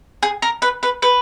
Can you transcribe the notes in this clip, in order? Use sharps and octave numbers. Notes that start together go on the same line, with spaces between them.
G#4
A#4
B4
B4
B4